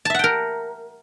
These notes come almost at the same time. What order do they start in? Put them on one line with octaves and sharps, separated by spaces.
A5 E5 F#5 G5 A#4